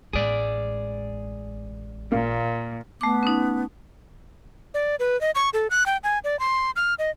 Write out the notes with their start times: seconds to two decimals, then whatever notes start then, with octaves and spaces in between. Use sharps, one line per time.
0.13 A1 G#3 G#4 D5
2.12 A#2 A#3
3.01 A3 B3 D6
3.23 C#4 D#4
4.74 D5
5.00 B4
5.21 D#5
5.35 C#6
5.54 A4
5.70 F#6
5.86 G5
6.04 G#5
6.24 D5
6.39 C6
6.76 F6
6.99 D#5